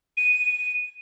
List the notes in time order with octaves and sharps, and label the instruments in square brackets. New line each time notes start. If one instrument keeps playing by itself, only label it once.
[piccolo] D#7